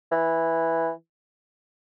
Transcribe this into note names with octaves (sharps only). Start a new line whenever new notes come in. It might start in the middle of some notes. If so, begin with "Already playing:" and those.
E3